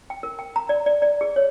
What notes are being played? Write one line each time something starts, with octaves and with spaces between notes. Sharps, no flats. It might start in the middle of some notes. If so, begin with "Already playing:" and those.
G5
A#4
G5
A#5
D5
D5
D5
G#4
C#5